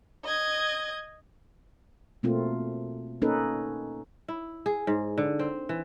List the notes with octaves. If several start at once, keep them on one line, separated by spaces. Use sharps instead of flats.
D#5 G#6
B2 A3 A#3 C4 F4
A#3 C#4 D#4 A4 B4
E4
G#4
G#2
D3
C4
E3